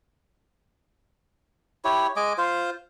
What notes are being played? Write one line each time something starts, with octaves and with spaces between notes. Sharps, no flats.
E4 G4 C#5
G#3 D#5 G#5 D6
F4 C5